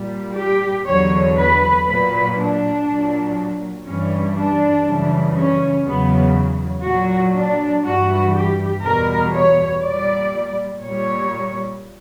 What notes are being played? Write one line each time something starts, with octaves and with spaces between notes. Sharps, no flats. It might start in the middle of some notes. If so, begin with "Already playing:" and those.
Already playing: A#2 G3
G4
E2 D3 F#3 C#5
B4
A#2 F#3 B4
D4
A#2 F#3
G2 E3 G3 C#4
D4
F#2 C#3 E3 G3
C#4
E2 C#3 F#3 B3
A#2 F#3 F#4
D4
G2 E3 G3 F#4
G4
E2 B2 G3 A#4
C#5
A#2 G3 D5
A#2 G3 C#5